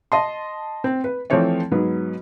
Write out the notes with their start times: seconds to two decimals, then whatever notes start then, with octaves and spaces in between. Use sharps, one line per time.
0.12 D#5 A5 C6
0.84 C4
1.04 B4
1.30 E3 F3 A3 C4 C#5 D5
1.72 G#2 F#3 B3